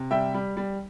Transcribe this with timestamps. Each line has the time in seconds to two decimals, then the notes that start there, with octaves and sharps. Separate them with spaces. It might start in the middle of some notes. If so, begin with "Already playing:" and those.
Already playing: C3
0.11 G3 E5 G5
0.34 G3
0.57 G3